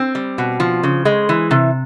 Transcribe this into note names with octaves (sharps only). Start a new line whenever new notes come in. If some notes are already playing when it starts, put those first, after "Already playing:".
Already playing: C4
G3
B2
F3
C#3
G#3
E3
C3